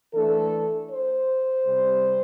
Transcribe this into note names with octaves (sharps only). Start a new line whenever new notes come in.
E3 A3 D4 A4
C5
C3 G3 C4